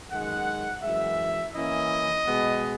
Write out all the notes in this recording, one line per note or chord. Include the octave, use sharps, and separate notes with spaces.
F#2 D#3 G#3 F#5
F#2 E3 G#3 E5
E3 A#3 C#4 E4 D#5
B2 G#3 B3